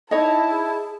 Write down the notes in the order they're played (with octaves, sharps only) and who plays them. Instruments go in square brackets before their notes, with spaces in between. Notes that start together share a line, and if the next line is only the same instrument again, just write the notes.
[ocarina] D#4 [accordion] E4 [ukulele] C#5 D#5 [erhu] A5
[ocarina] G#4